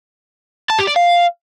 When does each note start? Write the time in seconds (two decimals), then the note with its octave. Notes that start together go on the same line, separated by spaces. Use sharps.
0.70 A5
0.78 G4
0.87 D5
0.96 F5